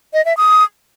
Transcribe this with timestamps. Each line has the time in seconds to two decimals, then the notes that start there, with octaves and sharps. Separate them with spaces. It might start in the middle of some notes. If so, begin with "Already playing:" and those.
0.13 D#5
0.25 E5
0.37 D#6